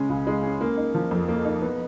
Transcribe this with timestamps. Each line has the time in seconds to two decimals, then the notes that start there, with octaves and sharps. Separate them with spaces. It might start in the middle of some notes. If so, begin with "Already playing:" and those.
Already playing: C#3 G#3 C#4
0.09 C#2
0.27 G#3
0.43 C#4
0.61 A#3
0.77 D#4
0.95 F3
1.11 F2
1.28 A#3
1.45 D#4
1.62 B3